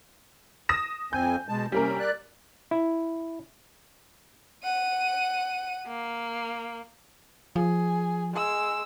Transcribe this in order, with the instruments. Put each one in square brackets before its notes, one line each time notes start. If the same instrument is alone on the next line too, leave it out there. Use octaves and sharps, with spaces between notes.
[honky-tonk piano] D#6 A#6 E7
[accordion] F2 C4 G#5 [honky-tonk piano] G6
[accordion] B2 G#3 A5
[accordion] C3 C#4 [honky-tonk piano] G3 A#3 A#4
[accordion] D5 F#6
[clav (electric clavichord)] E4
[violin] F#5 D#7
A#3
[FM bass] F3 [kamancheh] G#4
[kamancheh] G#3 E6